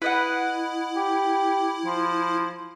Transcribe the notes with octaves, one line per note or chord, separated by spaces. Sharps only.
E4 B4 D#5 F#5
G4
F3